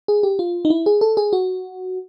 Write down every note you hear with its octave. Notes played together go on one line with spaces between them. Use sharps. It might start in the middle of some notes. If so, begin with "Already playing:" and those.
G#4
G4
F4
D#4
E4
G#4
A4
G#4
F#4